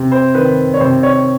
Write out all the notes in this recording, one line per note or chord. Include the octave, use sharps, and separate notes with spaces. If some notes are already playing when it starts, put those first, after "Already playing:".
Already playing: C3
C5
D#3 B4
C#5
C3 C5
C#5